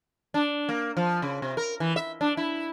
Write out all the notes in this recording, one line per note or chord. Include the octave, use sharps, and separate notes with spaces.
D4
A#3
F3
C#3
C3
A#4
E3
E5
D4
E4